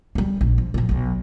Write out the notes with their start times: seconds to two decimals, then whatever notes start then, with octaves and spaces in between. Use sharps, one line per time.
0.15 G3 C#4
0.41 A#1
0.58 F3
0.74 A#2 F3
0.89 B1 F#3